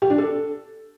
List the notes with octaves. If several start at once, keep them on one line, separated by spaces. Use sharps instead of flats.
G4
D4
A4